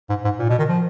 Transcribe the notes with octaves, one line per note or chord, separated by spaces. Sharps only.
G#2
G#2
A#2
B2
D#3
F3